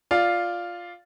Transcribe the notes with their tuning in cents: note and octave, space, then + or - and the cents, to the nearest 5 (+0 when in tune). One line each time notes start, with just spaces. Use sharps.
F4 +0 D5 +0 F5 +0